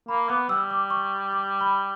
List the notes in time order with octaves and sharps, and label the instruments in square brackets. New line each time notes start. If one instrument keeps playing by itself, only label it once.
[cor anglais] A#3 [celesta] B5
[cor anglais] B3 [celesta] D6
[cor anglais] G3 [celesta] E6
[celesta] D6
C#6
D6
B5